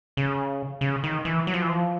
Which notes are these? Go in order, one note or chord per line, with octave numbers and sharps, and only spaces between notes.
C#3
C#3
D#3
E3
F#3
F3
E3
F3